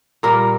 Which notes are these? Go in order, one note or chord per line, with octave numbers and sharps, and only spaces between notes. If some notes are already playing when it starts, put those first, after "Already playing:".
A#2 G3 A#3 A#4